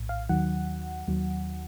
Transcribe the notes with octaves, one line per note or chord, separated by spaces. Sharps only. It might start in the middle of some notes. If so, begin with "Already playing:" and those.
Already playing: A#1 A2
F5
D#2 D#3 F#3 F#5
D#2 D#3 F#3